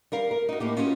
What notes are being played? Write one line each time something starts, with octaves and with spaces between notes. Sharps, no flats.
G3 A#4 F5
A#4
D#4 F#4
A2 A#3 G4
C#4 F4 F#4 B4 D#5